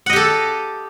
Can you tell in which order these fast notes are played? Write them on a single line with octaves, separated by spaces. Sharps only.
F#5 D#5 G4 A4